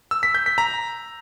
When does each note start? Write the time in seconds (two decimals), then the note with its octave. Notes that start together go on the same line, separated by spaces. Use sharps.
0.11 E6
0.23 B6
0.35 G6
0.46 B6
0.58 A#5